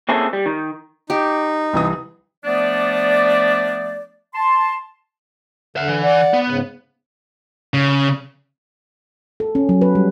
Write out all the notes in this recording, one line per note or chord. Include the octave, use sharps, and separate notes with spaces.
A#3 C4 C#4 E4 G#4 A4
G3
D#3
D#4 G4
C2 E3 D#6
F3 A3 B3 D4 D5
A5 C6
D3 E5 F#5
E3
D5 F#5
B3
G#2 C#3
C#3
A4
C#4
F#3
B4
G3